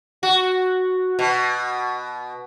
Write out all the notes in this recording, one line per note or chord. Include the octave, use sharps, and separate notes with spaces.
F#4
B2